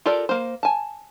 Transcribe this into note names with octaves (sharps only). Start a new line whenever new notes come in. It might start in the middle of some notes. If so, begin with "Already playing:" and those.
F4 G4 A4 A#4 D5
A#3 C5
G#5 A5